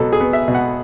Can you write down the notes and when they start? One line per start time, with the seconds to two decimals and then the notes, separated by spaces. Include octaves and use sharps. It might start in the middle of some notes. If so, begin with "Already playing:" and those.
Already playing: B2 F#3 A4
0.13 G#4
0.21 B3
0.33 E5
0.48 B2
0.55 F#5